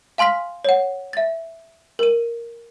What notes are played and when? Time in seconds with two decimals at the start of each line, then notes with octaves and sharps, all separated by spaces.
0.18 F5 G#5 C6 F6 B6
0.65 C#5 F#5
1.13 E5 A6
1.99 A#4 D#7